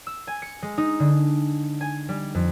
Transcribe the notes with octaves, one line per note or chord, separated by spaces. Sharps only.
E6
G#5
C#7
G#3
D#4
D3
G#5
G3
F2